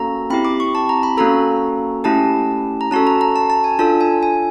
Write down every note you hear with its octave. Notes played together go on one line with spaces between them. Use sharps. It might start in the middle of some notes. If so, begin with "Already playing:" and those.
Already playing: A#3 C#4 F#4 A4 A#5
C4 E4 G4 B5
D6
C#6
A5
A#5
B5
A#3 C#4 F#4 A4 A#5
A3 C#4 E4 G4 A5
A#5
C#4 F#4 A4 A5
A#5
A#5
A5
A5
G#5
D4 F4 A4 A5
G#5
G#5